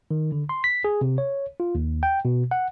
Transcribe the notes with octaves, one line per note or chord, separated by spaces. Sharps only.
D#3
D3
C6
B6
G#4
C3
C#5
F4
D#2
G5
B2
F#5